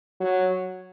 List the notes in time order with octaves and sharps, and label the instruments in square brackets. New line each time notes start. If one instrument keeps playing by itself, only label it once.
[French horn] F#3